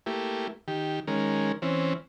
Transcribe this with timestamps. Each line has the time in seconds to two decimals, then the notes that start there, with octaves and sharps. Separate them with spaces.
0.06 A3 A#3 E4 G4
0.68 D#3 G4
1.07 D#3 G#3 C#4 A#4
1.62 E3 C4 C#4